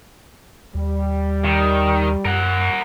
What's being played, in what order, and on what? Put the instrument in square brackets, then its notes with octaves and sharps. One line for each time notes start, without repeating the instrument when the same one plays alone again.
[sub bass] D#2 [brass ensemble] G3
[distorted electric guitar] D#3
[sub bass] F#2 [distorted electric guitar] A#4 F#5